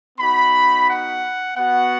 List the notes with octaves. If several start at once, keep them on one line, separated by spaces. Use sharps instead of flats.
B3 D#4 F#4 B5
F#5
B3 F#4 F#5